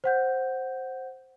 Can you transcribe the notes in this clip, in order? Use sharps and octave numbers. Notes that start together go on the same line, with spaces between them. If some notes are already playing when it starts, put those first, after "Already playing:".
C5 F#5 G6